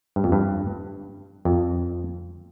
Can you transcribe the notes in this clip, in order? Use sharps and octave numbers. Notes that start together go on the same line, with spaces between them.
G2
F2
G2
F2